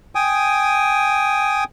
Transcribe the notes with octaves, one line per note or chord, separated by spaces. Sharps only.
G5 G#5 D#6